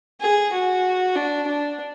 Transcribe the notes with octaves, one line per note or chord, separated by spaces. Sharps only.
G#4
F#4
D4
D4